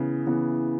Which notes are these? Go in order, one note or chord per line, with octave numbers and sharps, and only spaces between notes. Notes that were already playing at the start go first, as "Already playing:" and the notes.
Already playing: C#3 E3 B3
C#3 E3 B3